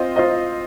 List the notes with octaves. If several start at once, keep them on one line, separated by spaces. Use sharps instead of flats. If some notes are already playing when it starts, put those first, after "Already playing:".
Already playing: C4 F4 C5 D#5
F4 C5 D#5